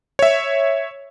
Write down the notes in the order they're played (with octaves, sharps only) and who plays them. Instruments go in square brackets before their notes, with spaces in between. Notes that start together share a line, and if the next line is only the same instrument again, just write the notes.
[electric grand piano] C#5 E5